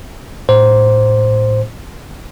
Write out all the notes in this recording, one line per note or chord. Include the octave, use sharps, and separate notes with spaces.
A2 C5